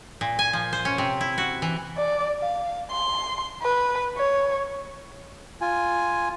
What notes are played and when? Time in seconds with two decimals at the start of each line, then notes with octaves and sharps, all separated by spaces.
0.21 A#2
0.39 G#5
0.53 F3
0.73 C5
0.85 C#4
0.98 C3
1.21 E4
1.38 F#4
1.62 E3
1.97 D5
2.40 F5
2.91 C6
3.62 B4
4.17 C#5
5.61 F4 G#5